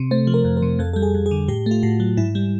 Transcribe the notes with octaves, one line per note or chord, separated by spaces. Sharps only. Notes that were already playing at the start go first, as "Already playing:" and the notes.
Already playing: C3
A3 C5
F3
A#4
F2
A#4
C3
F2 A4
G3 A4
G#4
F2
G#4
D3
A2 G4
A3 F4
A2 F#4
F#3
G#2 E4
G3